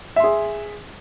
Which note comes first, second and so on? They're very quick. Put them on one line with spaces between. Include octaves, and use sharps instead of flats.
E5 C6 G#4